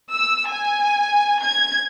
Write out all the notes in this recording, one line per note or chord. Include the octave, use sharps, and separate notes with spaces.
E6
G#5
G#6